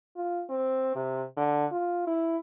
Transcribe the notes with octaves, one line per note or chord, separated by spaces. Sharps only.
F4
C4
C3
D3
F4
E4